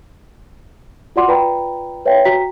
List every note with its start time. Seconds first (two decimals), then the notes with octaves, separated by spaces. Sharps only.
1.16 F4 F#4 D5 F#5 C6 D6
1.28 F4 B4 D5 G5 A#5 B5
2.05 B4 C#5 E5 F5 G5
2.25 F#4 G5 A#5 B6